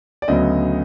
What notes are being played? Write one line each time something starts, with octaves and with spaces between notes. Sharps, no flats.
D5
D2 C#3 F#3 B3 D#5